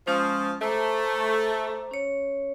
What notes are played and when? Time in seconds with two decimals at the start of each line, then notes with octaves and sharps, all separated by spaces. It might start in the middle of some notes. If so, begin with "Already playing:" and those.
0.07 F3 G#3 C#4 D#6
0.62 A3 C5 A#5 D6
1.91 C#4 C#5